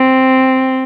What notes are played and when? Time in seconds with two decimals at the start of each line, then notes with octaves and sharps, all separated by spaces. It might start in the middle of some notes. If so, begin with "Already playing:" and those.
Already playing: C4